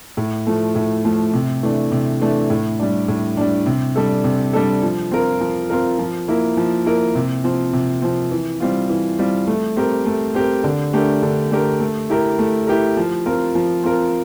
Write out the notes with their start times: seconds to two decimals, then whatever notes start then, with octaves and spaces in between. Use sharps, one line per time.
0.17 A2
0.47 F3 A3
0.75 A2
1.05 F3 A3
1.33 C3
1.63 E3 A3 D4
1.92 C3
2.21 E3 A3 D4
2.50 A2
2.79 G3 D4
3.08 A2
3.37 G3 D4
3.66 C3
3.96 G3 D4 A4
4.24 C3
4.53 G3 D4 A4
4.83 F3
5.11 C4 F4 A#4
5.40 F3
5.70 C4 F4 A#4
5.99 F3
6.28 A#3 E4 A#4
6.57 F3
6.86 A#3 E4 A#4
7.15 C3
7.44 F3 C4
7.73 C3
8.02 F3 C4
8.31 E3
8.60 G3 C4 F4
8.89 E3
9.19 G3 C4 F4
9.47 A3
9.77 C4 G4 A#4
10.06 A3
10.35 C4 G4 A#4
10.64 D3
10.93 A3 D4 G4 A#4
11.23 D3
11.51 A3 D4 G4 A#4
11.80 A3
12.10 E4 G4 A#4
12.39 A3
12.67 E4 G4 A#4
12.97 F3
13.26 C4 F4 A#4
13.55 F3
13.84 C4 F4 A#4